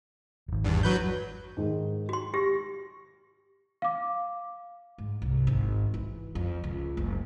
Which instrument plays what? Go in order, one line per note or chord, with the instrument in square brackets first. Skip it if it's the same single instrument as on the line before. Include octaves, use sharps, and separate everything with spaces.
[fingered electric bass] D#1 G#1
[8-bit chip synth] E2 G2
F#3 B4 G6
[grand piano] G#2 D#3 G#3
[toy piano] F#4 C6
[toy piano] G4 [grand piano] C#6 A#6
[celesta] F5 D6
[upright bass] G#2
C2
G#1
E3
F2
C#2
F#1